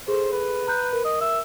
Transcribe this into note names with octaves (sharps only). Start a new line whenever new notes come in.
G#4 A4 C5
B4
A#5 F#6 G6
A#4
D#5
E5